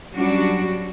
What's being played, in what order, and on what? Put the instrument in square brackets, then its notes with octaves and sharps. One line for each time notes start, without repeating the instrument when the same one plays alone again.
[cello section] F#3 G3 C#4 D4 F#4